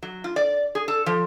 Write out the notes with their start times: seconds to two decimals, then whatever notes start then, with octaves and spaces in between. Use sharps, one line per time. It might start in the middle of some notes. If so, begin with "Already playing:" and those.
0.03 F#3
0.24 F4
0.36 D5
0.75 G#4
0.88 A4
1.06 F3